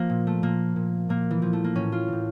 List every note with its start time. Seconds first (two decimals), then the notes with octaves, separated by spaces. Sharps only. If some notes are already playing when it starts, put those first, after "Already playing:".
Already playing: F3 A#3
0.10 A#2
0.27 A3
0.43 A#2 A#3
0.76 A#2
1.09 A#2 A#3
1.31 E3
1.42 A#2 F3
1.53 A3
1.64 A#3
1.75 A2 E3 C#4
1.92 F4
2.08 A2 E3